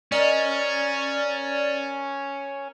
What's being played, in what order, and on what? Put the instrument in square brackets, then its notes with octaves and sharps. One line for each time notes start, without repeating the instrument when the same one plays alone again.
[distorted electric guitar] C#4 [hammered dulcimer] A#4 D#5 [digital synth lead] D5